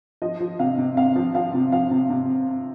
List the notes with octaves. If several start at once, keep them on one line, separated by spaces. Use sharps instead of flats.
F3 D#5
F3
C3 F5
C3
C3 F5
F3
F3 F5
C3
F3 F5
C3
C3